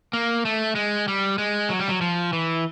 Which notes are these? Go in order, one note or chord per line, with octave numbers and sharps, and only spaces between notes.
A#3
A3
G#3
G3
G#3
F#3
G3
F#3
F3
E3